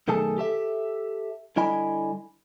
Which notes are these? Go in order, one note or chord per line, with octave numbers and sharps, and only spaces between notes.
B1 D#3 A3 G#4 A4 A5
G4 A4 E5
D3 G3 E4 D#5 G#5 B5